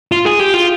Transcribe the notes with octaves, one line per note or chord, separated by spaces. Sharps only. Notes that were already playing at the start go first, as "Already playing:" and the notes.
F4
G#4
G4
F4